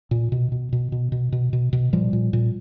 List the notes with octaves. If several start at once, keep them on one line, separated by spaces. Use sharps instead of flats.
A#2
B2
B2
B2
B2
B2
B2
B2
B2
A#2 F3 G3
A#2
A#2